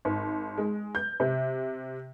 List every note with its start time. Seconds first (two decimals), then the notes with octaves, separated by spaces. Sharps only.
0.05 G#1
0.58 G#3
0.95 G6
1.20 C3